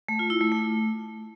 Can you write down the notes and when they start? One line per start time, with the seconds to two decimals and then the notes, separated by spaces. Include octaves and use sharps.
0.09 A3
0.19 F4
0.30 E4
0.41 A3
0.52 A3